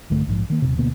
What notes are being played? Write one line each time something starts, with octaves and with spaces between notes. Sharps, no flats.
A#1 G2 D3 A3
A#1 G#2 F3
D#3 A#3
D#1 D#2 C3
D2 B2 A#3 B3